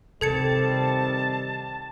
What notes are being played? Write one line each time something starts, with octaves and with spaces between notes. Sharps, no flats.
C3 D#3 G3 C4 A4 A5 G#6 C#7